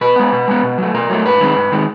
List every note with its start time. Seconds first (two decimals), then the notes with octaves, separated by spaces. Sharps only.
0.01 B2 B4
0.16 G#3 B3
0.32 B2
0.48 G#3 B3
0.63 B2
0.78 F#3 A3
0.94 B2 A#4
1.09 F#3 A3
1.25 G#2 B4
1.40 D#3 G#3 C4
1.56 G#2
1.72 D#3 G#3 C4